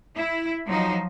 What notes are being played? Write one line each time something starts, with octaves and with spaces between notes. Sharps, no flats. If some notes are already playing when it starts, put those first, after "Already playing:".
E4
F3 F#3 D#4